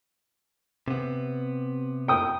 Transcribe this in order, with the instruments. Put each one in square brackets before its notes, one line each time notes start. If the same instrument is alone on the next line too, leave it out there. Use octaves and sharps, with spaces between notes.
[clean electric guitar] C3 B3
[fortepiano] G5 D#6